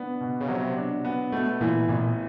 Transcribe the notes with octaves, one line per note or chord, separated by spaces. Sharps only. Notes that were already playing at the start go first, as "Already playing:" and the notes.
Already playing: B3 D4
B2
C#3
C3 F#3
D4
B3
B2 A3
A#2 E3
A1 A#2